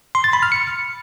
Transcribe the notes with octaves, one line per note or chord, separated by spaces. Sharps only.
C6
A6
B5
F6
C#7